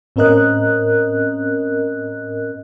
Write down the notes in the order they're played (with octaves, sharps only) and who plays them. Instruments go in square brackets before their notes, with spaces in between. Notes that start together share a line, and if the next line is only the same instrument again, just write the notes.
[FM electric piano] A2 C4 C#4 A#4 D#5 F#6